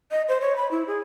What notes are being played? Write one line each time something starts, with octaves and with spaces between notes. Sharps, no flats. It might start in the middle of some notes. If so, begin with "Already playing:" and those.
D#5
C5
C#5
B5
E4
G#4